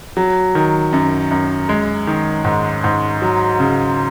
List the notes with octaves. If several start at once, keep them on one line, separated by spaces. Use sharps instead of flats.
F#3
D#3
F#2
F#2
G#3
D#3
G#2
G#2
F#3
C#3